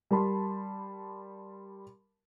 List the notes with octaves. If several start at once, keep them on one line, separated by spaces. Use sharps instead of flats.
G3 A#4 A5 B5 C6